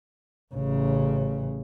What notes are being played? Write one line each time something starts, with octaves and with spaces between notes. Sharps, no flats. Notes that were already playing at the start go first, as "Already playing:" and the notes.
A1 C#3